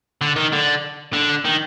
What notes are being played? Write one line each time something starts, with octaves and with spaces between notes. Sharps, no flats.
D3
D#3
D3
D3
D#3